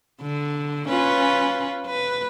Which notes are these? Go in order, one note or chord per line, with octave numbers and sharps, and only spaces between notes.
D3
C#4 F4 B4
B4